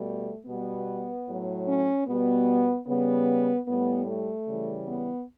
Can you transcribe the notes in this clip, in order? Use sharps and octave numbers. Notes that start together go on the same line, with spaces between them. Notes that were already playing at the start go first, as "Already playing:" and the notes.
Already playing: B2 G3 A3
B2 G3 B3
A2 F#3
C#4
B2 G3 B3
C#3 G3 B3
A2 G3 B3
A3
C#3 E3 G3
B3